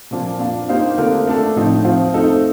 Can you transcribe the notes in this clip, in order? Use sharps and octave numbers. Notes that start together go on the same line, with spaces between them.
A#2 F3 A#3 D4
A#3 D4 F4
A#3 D#4 G4 C5 F5
D3 A3 C4 F4 A#4
A3 D4 A4
A2 F3 C4 D#4
F3 C4 F4
A3 C4 D#4 A4